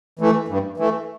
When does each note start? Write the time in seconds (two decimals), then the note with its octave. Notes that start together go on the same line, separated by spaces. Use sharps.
0.19 E3 A3
0.48 G2
0.78 E3 A3